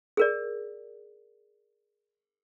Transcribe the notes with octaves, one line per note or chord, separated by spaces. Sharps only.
G#4 A#4 D5